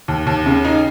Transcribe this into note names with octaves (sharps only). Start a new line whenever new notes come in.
D#2
D#2
C#3
D#4